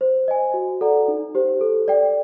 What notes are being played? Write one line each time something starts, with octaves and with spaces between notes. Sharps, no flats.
C5
D#5 G#5
F#4
A4 D5 F#5 A#5
D#4
G4 C5
A4
D5 G5